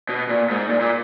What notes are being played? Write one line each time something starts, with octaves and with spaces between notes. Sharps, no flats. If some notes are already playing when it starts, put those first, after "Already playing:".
B2
A#2
G#2
A#2
A#2